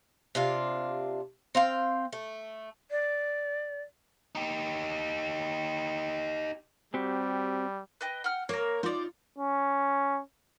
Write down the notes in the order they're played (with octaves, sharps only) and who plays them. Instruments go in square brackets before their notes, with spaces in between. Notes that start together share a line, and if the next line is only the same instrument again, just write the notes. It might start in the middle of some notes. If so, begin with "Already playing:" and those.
[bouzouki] C3 D4 F4
C4 F5 G5
A3
[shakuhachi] D5
[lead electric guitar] D#4 G4
[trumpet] G3 [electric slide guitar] C4 F#4 G4
[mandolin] B4 D#5 G5
F#5 G5 F6
[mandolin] A#3 A#4 [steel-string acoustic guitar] C#5
[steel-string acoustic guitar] D#4 F4 [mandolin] C5 D5
[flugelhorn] C#4